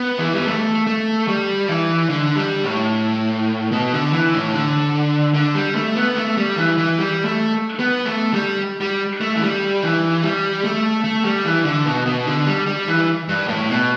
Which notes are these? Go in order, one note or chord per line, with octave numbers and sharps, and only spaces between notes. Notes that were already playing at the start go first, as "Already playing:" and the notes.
Already playing: B3
E3
G3
A3
A3
G3
E3
D3
G3
A2
B2
D3
E3
A2
D3
D3
G3
A3
B3
A3
G3
E3
E3
G3
A3
B3
A3
G3
G3
A3
E3
G3
E3
G3
A3
A3
G3
E3
D3
B2
B2
D3
G3
G3
E3
G2
A2
B2